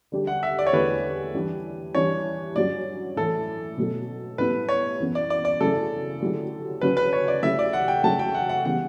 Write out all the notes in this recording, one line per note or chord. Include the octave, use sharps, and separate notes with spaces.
D3 G3 D4 G4
F#5
E5
D5
C#5
E2 D3 A3 E4 G4 B4
E3 G3 D4 G4
E3 G3 D4 C#5
G2 F#3 C#4 F#4 D5
A2 E3 A3 A4
B2 F#3 A3
A2 G3 B3 E4 B4
C#5
F#2 E3 B3
D5
D5
D5
F#2 C#3 F#3 A3 E4 A4
D3 F#3 A3 E4 G4
C#3 F#3 C#4 F#4 B4
B4
C#5
D5
C#3 F#3 A3 E4 G4 E5
D5
F#5
G5
C#3 F#3 A3 A5
G5
F#5
F#5
C#3 E3 G3 B3 F#5